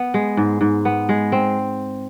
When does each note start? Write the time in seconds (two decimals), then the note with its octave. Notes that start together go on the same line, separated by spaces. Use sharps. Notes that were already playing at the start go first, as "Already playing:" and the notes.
Already playing: B3
0.14 G#3
0.37 G#2
0.61 G#2
0.85 B3
1.09 G#3
1.32 C4